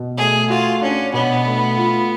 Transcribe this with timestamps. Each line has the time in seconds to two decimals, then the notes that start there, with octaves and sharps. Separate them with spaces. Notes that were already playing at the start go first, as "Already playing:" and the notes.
Already playing: B2
0.18 A3 G#4
0.50 F4 F#4
0.81 C#4 D4
1.13 B2 B3
1.45 A3
1.77 F4